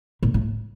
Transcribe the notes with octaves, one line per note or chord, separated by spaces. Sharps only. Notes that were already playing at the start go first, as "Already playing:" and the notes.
A#2
A2